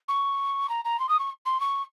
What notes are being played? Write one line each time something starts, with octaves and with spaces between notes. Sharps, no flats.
C#6
A#5
A#5
C6
D#6
C#6
C6
C#6